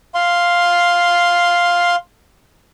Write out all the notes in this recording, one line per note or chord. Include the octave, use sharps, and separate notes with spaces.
F5 C6